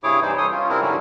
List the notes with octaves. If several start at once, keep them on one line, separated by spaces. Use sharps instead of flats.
G2 C3 E4 G#4 C#5 D6
E3 G3 D#4 C5
A4 C#5 C6 D#6
C#4 F4
C3 C4 D4 E4 A#4
G#2 D3 F#3 G3 C#4 E4